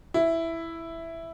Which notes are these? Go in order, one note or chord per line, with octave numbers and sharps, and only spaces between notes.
E4